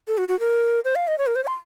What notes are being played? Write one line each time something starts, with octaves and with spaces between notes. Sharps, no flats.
A4
F#4
F#4
A#4
C5
F5
D#5
C#5
A#4
C5
C#5
C6